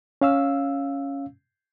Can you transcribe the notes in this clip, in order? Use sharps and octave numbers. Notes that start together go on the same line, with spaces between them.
C#4 F5 E6